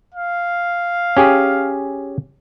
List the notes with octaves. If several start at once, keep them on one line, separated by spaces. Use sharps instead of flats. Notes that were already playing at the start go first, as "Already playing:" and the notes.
F5
C#4 G4 G#4